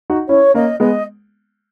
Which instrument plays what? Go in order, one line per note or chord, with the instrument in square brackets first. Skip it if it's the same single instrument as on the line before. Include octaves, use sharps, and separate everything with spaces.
[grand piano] D#4 F#4
[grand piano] C#4 E4 [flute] C#5
[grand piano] A#3 C#4 [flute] D#5
[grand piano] G#3 B3 [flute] D#5